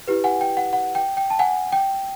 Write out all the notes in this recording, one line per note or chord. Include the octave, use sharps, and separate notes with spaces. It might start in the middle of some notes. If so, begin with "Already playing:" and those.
E4 G4 B4
F#5 G#5
G5
F#5
F#5
G5
G5
A5
F#5 G#5
G5